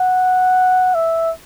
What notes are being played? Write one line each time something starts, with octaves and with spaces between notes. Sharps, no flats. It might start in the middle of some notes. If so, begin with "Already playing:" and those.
Already playing: F#5
E5